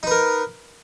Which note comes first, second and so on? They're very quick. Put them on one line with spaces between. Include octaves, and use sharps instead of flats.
D#4 B4 A#4